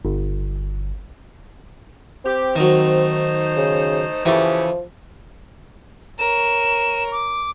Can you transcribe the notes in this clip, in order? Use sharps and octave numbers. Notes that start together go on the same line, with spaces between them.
G1
C4 G4
D#3 F#3 A3 D#4 C5
C#3
C#3 E3 F3 G4 A4
A#4 C#5 E7
D6